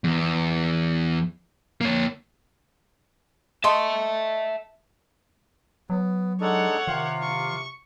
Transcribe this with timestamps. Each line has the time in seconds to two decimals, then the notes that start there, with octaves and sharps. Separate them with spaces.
0.04 E2
1.81 A#3 C#5
3.64 D#5 E5 A5 C6 C#6
5.90 F#3 B3
6.40 G#3 D4 D#4 A4 C#5 F#5
6.88 C3 D#3 F4 F5
7.22 C#6